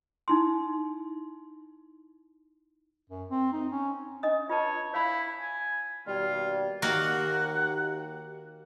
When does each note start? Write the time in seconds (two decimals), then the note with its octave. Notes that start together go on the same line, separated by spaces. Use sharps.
0.28 D#4 E4 C6
3.10 F#2
3.30 C4
3.53 D#4
3.72 C#4
4.23 D4 D#5 D#6
4.49 F4 B4 C#5 A5
4.93 E4 C#5 F5 B5
5.40 G#5
6.07 D#2 B2 G3 F4
6.82 D#2 D#3 A#3 F#4 G4 F#5